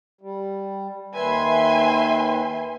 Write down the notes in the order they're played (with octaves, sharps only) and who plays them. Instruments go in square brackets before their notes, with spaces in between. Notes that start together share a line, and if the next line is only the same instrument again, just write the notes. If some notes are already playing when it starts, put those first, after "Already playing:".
[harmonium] G3
[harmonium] D#2 D#3 B4 [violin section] E5 G#5 C6